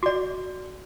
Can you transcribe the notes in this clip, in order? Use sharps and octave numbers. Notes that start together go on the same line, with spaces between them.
F#4 D5